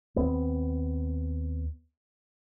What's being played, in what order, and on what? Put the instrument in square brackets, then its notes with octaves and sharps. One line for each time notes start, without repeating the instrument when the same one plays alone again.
[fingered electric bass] D#2 B3 C4